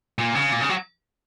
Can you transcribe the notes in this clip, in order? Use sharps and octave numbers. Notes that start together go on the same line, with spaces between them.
A#2
C#3
A#2
C#3
F#3